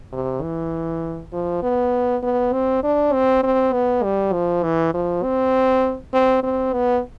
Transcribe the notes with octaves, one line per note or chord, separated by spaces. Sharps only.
C3
E3
F3
B3
B3
C4
D4
C4
C4
B3
G3
F3
E3
F3
C4
C4
C4
B3